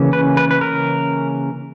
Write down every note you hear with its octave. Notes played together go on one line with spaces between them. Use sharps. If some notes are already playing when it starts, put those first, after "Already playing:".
Already playing: C#3 E3 A#3 C#4
B4
B4
B4
A#4